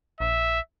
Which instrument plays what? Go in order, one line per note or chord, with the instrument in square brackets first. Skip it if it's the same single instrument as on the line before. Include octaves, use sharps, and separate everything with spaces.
[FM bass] A#1 [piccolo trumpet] E5